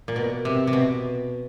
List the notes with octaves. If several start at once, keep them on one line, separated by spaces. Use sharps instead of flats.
A#2
B2
C3
C3
B2